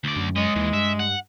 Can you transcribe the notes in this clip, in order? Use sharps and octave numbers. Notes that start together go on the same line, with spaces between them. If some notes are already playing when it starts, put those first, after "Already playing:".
D2 D5
F#2
G#3 C#5 D#5
D#2 E3
G2 E5
F#5